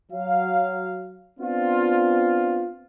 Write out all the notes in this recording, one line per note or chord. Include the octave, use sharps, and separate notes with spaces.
F#3 F5
B3 C4 D4 F4